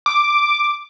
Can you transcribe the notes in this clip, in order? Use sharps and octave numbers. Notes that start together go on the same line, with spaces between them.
D6